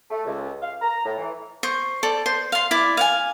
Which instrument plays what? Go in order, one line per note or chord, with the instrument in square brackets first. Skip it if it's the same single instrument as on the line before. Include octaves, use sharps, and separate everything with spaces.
[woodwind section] A3
C#2
F5
A#5
A2
E3
[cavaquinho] C5 C#6
A4 D5
C5
F5 C6
E4 D5 D6
F5 F#5 G#5